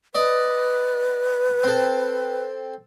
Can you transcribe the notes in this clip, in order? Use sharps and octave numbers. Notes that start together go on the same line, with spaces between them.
B4 D5 D#5
C4 A4